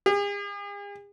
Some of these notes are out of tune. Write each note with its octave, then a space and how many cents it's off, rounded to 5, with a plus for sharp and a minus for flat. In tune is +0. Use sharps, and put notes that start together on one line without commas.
G#4 -45